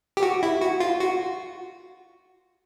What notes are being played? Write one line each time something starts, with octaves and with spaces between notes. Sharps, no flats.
G4
F#4
E4
F#4
F4
F#4